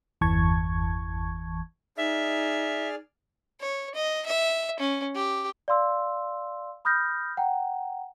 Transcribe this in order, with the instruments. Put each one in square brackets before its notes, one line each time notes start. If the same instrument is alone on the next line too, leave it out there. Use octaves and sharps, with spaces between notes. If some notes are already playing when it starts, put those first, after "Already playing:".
[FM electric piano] G1 E2 E3 A5 C#6 G#6
[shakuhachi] D#4 [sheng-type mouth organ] G#4 D5 F6 [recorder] E5
[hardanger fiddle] C#5
D#5
E5
C#4
G4
[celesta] D5 F5 C6 E6
B5 D#6 F6 G6 A#6
F#5 G5 A#5